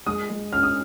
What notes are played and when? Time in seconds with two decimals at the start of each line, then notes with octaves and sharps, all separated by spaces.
0.06 G#3 D#6
0.29 G#3
0.53 C#4 F6
0.63 D#6